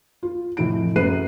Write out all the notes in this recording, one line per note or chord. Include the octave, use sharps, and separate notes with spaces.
F4
F1 A2 D7
F#2 A4 B4 F#6 C7 D#7